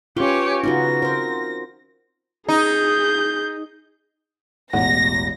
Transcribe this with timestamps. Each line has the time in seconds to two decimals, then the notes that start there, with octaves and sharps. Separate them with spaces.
0.17 C#4 F4 G4 B4 C#5 F5 G5 G#5
0.64 C#3 B3 C#4 D#4 F4 F#4 A#6
1.02 C4 A#4 C5
2.49 D#4 G#4 G6
4.73 E1 A1 E2 F#5 A#6